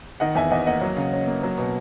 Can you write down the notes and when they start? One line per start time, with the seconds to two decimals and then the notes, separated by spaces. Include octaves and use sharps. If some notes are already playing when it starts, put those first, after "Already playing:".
0.20 D#3 D#5 F#5
0.35 E2 E5 G#5
0.51 E2 D#5 F#5
0.66 A#3 D#5 F#5
0.81 F#3
0.96 C#3
1.13 C#4
1.27 A#3
1.43 F#3
1.58 B2